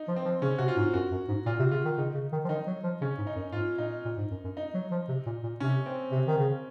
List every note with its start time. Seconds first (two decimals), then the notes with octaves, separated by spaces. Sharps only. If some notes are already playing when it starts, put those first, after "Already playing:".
Already playing: D#4
0.08 F3
0.16 C4
0.25 F3
0.42 C#3 C#4
0.58 C3 F#4
0.68 F4
0.77 G#2
0.93 F#2 F#4
1.11 F#2
1.28 G#2
1.46 A#2 F4
1.59 C3
1.71 C#3 F4
1.85 D#3
1.97 C#3 D#4
2.14 C#3
2.32 D#3
2.45 F3
2.49 D#3 D#4
2.67 F#3
2.84 F3
3.01 C#3 C#4
3.18 G#2
3.27 D#4
3.36 F#2
3.52 G#2 F4
3.78 A#2 D#4
4.05 A#2
4.18 G#2
4.31 F#2
4.44 F#2
4.57 D#4
4.74 F#3
4.91 F3
5.09 C3
5.26 A#2
5.43 A#2
5.60 C3 C#4
5.86 C4
6.12 C3
6.27 D#3
6.38 C#3